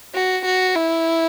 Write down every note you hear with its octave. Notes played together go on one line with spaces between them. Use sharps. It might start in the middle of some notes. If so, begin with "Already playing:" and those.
F#4
F#4
E4